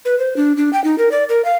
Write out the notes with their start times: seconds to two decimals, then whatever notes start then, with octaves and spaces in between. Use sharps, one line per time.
0.05 B4
0.19 C5
0.37 D4
0.57 D4
0.73 G5
0.84 D#4
0.98 A#4
1.11 D5
1.29 A#4
1.45 F5